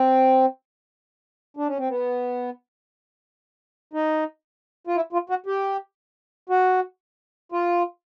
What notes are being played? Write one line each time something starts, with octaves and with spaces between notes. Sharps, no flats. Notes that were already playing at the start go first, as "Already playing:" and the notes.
Already playing: C4
D4
C#4
C4
B3
D#4
F4
E4
F4
F#4
G4
F#4
F4